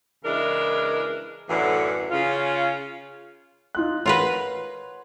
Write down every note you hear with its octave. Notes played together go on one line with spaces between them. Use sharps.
C#3 E3 G#3 D4 E4 A#4
F#2 A2 D3 E3
C#3 C#4 F4
D#4 F4 F#6
F4 A#4 B4 C#5 F#5 C6